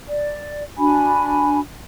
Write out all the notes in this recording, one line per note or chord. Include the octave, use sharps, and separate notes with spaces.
D5
D4 F#4 G#5 B5